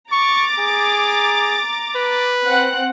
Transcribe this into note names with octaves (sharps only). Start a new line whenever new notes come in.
A#5 C#6 D6 A6
G#4
B4
C4 F#5 F#6